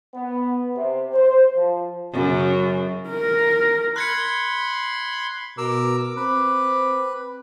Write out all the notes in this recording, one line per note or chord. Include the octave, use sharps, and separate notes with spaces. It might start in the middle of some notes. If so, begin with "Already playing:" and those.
B3
C3
C5
F3
F#2 C#3
A#4
B5 C6 F#6 G#6 C#7
B2 A#4 D6 E6
C4 B4